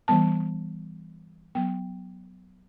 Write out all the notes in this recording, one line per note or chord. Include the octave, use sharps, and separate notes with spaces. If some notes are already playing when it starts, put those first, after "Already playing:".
E3 G3 B3 A5
F#3 B3 G5